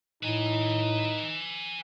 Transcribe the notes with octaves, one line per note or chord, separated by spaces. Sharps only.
A2 D#4 B4 G#5